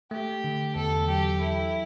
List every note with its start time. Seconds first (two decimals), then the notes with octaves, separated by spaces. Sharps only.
0.11 A3 G4
0.44 D3
0.75 E2 A4
1.08 F#3 G4
1.41 E4 A4